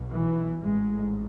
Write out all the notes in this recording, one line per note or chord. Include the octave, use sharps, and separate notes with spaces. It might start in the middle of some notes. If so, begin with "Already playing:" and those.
Already playing: B1 B2
E3
A1 G#2 G#3